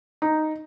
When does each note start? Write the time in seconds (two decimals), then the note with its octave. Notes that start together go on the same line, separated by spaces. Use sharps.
0.22 D#4